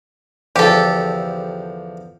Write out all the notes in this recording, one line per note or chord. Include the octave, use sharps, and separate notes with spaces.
E2 D3 F3 G4 A4